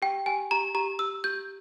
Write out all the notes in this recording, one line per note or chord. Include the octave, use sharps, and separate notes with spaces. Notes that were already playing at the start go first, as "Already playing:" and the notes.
G4 G5
G4 G#5
G4 A#5
G4 A#5
G4 E6
G4 G6